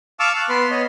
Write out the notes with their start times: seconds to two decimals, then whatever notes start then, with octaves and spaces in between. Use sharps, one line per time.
0.20 F5 A5 C#6 D6 E6 F6
0.37 F#6
0.49 B3 B4 C6
0.71 C#5 D#5